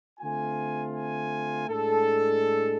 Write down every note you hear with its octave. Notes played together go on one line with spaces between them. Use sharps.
D3 A3 C4 F4 G#5
G#5
A2 G#3 D4 A4